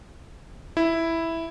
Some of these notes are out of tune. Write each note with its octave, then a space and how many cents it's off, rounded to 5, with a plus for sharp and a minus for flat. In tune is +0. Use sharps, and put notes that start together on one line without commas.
E4 +0